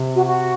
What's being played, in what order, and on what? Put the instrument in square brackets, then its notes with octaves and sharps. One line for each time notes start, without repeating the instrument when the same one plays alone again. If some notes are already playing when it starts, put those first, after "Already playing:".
Already playing: [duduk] C3
[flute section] F#4
F#4